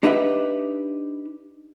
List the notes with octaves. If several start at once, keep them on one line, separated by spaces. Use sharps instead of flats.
D4 D#4 G4 B4 E5 F#5